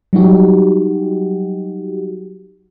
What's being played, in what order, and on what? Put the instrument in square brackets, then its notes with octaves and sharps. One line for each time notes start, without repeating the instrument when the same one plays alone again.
[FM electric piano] F#3 G3 D#4 F#4 G4